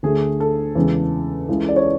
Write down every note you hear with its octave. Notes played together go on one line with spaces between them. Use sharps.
D2 D3 A3 G#4
A4
E2 C#3 G#3
C#2 C#3 E3 G#3
D5
C#5